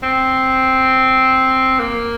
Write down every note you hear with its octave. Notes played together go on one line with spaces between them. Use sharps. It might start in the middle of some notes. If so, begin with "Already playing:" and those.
C4
A#3